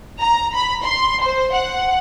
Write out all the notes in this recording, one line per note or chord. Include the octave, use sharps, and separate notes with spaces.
A#5
B5
C6
C5
F#5